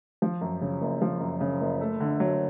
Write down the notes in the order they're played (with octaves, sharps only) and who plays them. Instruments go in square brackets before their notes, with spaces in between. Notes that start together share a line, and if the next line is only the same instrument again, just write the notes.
[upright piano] F3
F#2
C#3
F#1
F3
F#2
C#3
F#1
A3
D3
F#3